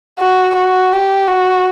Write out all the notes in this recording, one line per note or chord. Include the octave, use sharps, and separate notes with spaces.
F#4
F#4
G4
F#4